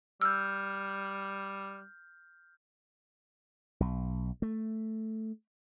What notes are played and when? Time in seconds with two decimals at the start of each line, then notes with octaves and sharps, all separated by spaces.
0.22 G3 E6 F6 G6
3.80 B1
4.42 A3